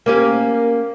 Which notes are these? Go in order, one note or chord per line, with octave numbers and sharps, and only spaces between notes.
A#3 C#4 G4